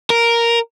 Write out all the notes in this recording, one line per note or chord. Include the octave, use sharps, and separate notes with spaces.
A#4